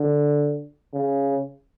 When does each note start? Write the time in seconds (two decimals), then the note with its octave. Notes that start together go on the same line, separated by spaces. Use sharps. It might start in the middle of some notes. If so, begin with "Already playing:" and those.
Already playing: D3
0.94 C#3